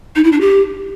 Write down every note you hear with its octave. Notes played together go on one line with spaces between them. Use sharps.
D#4
E4
D4
G4